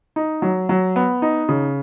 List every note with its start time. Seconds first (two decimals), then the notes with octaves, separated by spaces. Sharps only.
0.16 D#4
0.42 F#3
0.69 F#3
0.96 B3
1.22 D#4
1.49 C#3